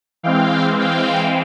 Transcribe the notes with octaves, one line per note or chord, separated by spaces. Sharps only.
E3 G#3 C4 F5 G5
F5 G5